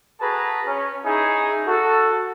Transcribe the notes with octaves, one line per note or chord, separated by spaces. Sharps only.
F#4 G#4 A4 B4 A5 A#5
C#4
C#4 D#4 E4 G#4 G#5
F#4 A4